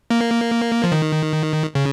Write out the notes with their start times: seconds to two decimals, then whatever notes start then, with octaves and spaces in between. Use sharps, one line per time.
0.10 A#3
0.84 F3
0.92 D#3
1.75 C#3